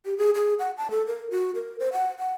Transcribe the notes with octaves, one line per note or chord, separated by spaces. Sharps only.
G4
G#4
G#4
F#5
A5
A4
A#4
F#4
A#4
C5
F#5
F#5